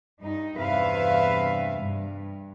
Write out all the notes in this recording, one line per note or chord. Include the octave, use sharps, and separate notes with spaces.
G2 D#4
E2 G2 C3 B4 E5 F5
G2